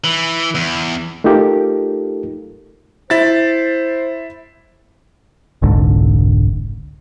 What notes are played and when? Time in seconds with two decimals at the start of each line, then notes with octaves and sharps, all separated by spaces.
0.04 E3
0.55 E2
1.24 A3 D#4 F4 G4 A4 A#4
3.10 E4 C5 A6
5.62 F1 C2 G#2 D3